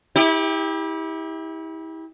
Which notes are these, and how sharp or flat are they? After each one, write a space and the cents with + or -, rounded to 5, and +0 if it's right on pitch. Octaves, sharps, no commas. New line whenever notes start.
E4 -30 G4 +25